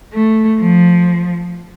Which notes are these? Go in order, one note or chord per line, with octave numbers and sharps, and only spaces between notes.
A3
F3